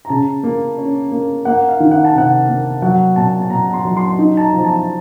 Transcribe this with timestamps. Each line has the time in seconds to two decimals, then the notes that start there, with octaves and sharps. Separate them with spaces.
0.05 A#5
0.09 C#3 A5
0.43 A#3
0.78 C#4
1.11 A#3
1.45 A#3 F#5
1.69 F5
1.80 D#3
1.91 F#5
2.05 A5
2.14 C3 F#5
2.48 A#3
2.82 F#3 F#5
3.16 A#2 A5
3.39 A5
3.50 A#2 A#5
3.66 A#5
3.73 C6
3.85 F#3
3.97 C6
4.19 D#4
4.37 A5
4.41 A#5
4.53 F3
4.65 A5